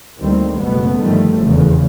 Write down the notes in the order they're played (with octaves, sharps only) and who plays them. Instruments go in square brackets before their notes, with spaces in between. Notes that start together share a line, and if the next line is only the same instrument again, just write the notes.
[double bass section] D2 D#3 G3 A#3 C4
F#1 B2 A3 B3
G2 D3 D#3 F3 G3 A3
F1 E2 C#3